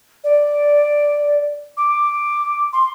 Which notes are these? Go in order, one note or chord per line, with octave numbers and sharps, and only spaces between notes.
D5
D6
C6